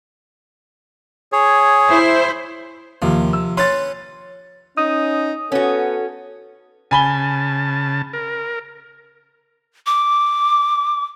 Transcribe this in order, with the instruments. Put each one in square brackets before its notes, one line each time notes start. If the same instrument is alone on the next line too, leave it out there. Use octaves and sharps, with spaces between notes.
[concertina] G#4 C#5
[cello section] E4 C5
[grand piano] D#2 [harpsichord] C3 F3
[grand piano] E6
[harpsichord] C#4 B4 C#5 [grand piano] C6 A6
[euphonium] C#4 [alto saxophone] D#4 [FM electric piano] D#6
[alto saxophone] B3 [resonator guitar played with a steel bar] C#4 F#4 [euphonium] A4
[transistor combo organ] C#3 A5 [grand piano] G#5 B5 G7
[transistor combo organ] A#4
[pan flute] D6